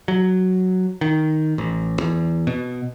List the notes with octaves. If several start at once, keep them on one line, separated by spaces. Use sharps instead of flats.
F#3
D#3
A1
E2
B2